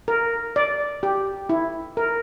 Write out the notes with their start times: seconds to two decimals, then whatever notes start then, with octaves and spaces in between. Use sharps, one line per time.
0.08 A#4
0.56 D5
1.03 G4
1.49 E4
1.97 A#4